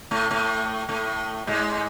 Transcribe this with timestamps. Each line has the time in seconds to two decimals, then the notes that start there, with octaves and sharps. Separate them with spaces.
0.11 A2 A3
0.31 A2 A3
0.89 A2 A3
1.47 G#2 G#3